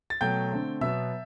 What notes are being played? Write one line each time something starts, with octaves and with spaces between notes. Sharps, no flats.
A6
B2 F#3 A3 G5 G6
D3 A3 C4
B2 F#3 B3 E5 E6